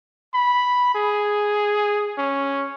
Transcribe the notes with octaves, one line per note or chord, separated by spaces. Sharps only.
B5
G#4
C#4